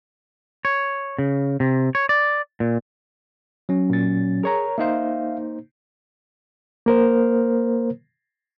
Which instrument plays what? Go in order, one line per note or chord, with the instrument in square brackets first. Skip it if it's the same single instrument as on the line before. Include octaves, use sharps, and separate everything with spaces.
[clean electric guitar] C#5
C#3
C3
C#5
D5
A#2
[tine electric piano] F#3 C#4
[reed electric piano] A#2 A6
[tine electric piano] G#4 [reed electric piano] A#4 C#5 A#5
[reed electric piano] A#3 D#4 C5 [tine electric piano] E5 F5
[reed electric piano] A#3 A#4 C5